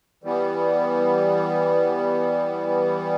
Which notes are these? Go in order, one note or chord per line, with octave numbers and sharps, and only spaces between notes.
E3 G3 B3